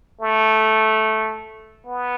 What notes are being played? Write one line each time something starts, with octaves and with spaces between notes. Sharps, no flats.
A3
B3